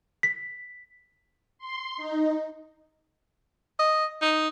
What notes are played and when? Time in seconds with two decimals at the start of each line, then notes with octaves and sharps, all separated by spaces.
0.23 B6
1.58 C6
1.97 D#4
3.80 D#5
4.22 D#4